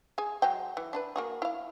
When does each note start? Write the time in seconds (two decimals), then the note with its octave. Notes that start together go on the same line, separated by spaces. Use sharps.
0.18 G#4 G#5
0.42 F#3 G#3 G5
0.77 E3
0.93 D4 A4 B4
1.16 A#3 F#4 G#4
1.42 E4 F5